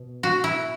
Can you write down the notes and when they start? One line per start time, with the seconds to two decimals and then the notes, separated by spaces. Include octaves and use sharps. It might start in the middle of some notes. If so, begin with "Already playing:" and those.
Already playing: B2
0.23 F#4
0.44 E4